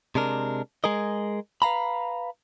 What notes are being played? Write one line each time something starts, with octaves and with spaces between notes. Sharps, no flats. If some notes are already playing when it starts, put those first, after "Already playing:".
C3 G#3 D4 A#4
G#3 G#4 A#4 D#5
B4 F5 A#5 B5